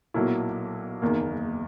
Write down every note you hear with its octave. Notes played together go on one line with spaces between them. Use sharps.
B1 A#2 F#3 A#3 E4
F#1 E2 D#3 A#3